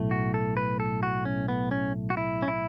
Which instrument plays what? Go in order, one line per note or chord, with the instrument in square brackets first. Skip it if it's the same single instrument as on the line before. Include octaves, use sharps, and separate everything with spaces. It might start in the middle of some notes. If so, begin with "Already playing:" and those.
Already playing: [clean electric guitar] B1 A2 A3
F#4
A4
B4
A4
F#4
C#4
B3
C#4
F#4
E4
C#4
E4